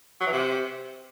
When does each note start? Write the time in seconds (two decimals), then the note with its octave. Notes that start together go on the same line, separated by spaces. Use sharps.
0.20 F#3
0.26 E3
0.32 C3